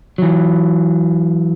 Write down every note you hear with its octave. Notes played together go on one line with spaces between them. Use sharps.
E3 F#3